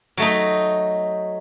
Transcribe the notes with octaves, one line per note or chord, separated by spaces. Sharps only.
F#3 A3 D#4